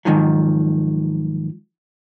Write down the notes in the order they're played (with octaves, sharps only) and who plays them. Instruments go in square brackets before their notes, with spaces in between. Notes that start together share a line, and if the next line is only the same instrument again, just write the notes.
[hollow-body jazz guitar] G#2 D#3 F3 F#3